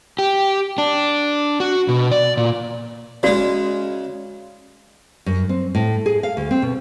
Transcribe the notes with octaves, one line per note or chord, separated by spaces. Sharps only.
G4
D4
F#4
B2
D5
A#2
C#3 G#3 F#4 D5
F#2
C4
A2
G#4
F5
D2
C4
B2